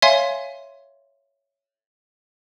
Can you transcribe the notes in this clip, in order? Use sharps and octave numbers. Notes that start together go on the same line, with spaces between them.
C#5 E5 F5 G#5 C6